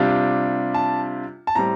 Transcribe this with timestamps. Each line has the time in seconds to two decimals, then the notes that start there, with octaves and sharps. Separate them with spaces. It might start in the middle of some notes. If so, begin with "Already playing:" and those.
Already playing: C3 G3 D4 F4
0.74 A5
1.47 A5
1.55 A2 G3 C4 A#5